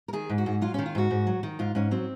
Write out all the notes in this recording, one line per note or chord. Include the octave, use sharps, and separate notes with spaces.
A#4
D#3 G#4
G#2
F#4
G#2
F#3 F4
C#4
D#3
F4
G#2 F#4
G#2
F#3
D#3
G#2 F4
G#2 C#4
F#3 C4